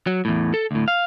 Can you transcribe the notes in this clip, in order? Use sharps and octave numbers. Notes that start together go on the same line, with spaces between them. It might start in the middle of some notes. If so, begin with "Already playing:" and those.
F#3
E2 A2
A4
D2 A2
F5